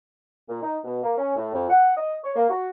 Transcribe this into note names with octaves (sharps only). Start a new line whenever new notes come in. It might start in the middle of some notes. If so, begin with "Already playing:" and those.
A#2
D#4
B2
A#3
C#4
A2
F2
F#5
D#5
C#5
A#3
F#4